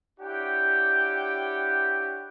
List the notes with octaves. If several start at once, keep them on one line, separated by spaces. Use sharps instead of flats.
D4 E4 G4 C#5 F#5 G5